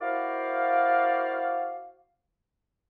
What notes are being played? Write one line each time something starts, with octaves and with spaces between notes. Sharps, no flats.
E4 F#4 A#4 C5 D5 F5